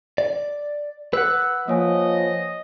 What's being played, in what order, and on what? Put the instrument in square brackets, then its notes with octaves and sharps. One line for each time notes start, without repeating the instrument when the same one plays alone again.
[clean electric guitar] D5
[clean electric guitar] B4 F#5 [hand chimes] E6 F#6
[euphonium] F3 [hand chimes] A#3 C#5 G#5 [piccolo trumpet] D#5